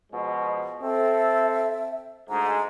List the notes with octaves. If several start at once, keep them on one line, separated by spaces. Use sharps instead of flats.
B2 F3 G#3
C4 A4 E5
D2 G#2 A#5